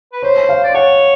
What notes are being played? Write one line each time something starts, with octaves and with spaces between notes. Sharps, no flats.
B4
C5 C#5
F5
D5
C#5 F#5